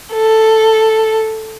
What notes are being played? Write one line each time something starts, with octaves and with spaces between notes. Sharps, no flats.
A4